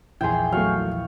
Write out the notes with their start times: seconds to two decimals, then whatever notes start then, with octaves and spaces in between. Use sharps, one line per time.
0.21 A#1 E2 E4 G#4 G5 C6
0.52 F#3 A3 F5 C#6